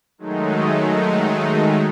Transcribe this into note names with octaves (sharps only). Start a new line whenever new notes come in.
D#3 F#3 G#3 A3 D#4